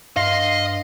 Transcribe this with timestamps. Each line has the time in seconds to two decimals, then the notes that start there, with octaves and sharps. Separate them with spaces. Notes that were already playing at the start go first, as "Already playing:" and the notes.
0.16 G2 D#5 F5 C6